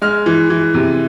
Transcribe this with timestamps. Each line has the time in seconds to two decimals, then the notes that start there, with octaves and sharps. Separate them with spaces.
0.02 G#3 F6
0.26 E3
0.50 E3
0.74 C3